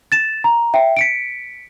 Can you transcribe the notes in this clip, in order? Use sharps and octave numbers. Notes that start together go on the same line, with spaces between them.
A6 E7
A#5
E5 G5
B6 C#7 D7